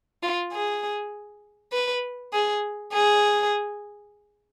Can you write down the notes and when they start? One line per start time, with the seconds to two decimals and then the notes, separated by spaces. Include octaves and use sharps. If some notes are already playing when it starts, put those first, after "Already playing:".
0.23 F4
0.52 G#4
1.73 B4
2.33 G#4
2.93 G#4